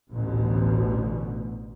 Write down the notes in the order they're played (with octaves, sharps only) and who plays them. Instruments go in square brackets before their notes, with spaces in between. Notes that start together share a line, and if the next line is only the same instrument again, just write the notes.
[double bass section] A1 D2 B2